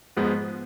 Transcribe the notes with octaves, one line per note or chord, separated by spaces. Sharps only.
G#2 F3 G#3 B3